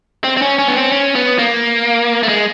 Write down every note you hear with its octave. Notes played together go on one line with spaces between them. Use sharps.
C4
C4
C#4
C#4
B3
C4
C#4
B3
A#3
A3
G#3